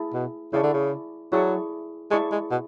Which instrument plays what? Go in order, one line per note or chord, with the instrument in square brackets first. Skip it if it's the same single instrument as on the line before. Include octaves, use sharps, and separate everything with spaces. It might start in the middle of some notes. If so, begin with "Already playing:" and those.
Already playing: [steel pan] E4 G#4 A5
[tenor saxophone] B2
[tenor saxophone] C#3 [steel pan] E4 G#4 D5 A5 C#6
[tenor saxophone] D3
C#3
[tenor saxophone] F#3 [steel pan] E4 G#4 D5 A5 C#6
[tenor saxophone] G#3 [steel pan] E4 G#4 D5 A5 C#6
[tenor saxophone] G#3
B2